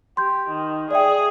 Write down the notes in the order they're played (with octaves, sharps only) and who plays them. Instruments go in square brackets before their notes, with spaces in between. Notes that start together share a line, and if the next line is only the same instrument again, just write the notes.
[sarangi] G4 [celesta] C6 G6
[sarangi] D#3
[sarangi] G#4 [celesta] D5 E5 G5